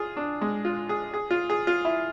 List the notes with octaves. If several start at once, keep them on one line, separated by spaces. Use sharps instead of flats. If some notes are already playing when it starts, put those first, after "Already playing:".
Already playing: F4 G#4
D4
G#3
F4
G#4
G#4
F4
G#4
F4
E4